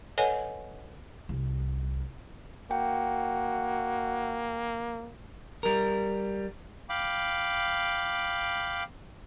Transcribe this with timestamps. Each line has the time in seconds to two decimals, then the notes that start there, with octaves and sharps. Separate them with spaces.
0.18 A4 B4 C#5 D#5 F#5 G#5
1.29 C2
2.71 A#3 F#4 G5
5.63 G3 A#4
6.89 F5 G5 B5 D6